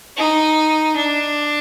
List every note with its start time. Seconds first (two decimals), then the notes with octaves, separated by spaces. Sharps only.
0.17 D#4
0.96 D4